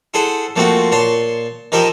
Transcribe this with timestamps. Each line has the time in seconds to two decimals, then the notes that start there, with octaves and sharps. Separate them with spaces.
0.14 E4 G#4 A4 C5 F#5
0.56 F3 A3 A#3 C4 F#4
0.92 A#2 C#5 A5 C6
1.72 D#3 F3 D#4 G4 A#4 E5